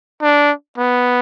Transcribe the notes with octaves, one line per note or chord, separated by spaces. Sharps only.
D4
B3